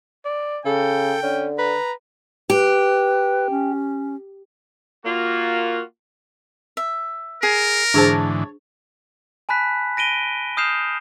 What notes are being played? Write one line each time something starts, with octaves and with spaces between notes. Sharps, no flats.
D5
C#3 A4 G5
D3 C#4
B4 A#5
G4 B4
C#4
A#3 F4 F#4
E5
G#4 A#4
G#2 D3 E3 D4 G#4 C5 C#5 A5
G#5 A5 B5 F#6 B6
A#6 D7 D#7 G7
D#6 F6 G6 C7 E7 F7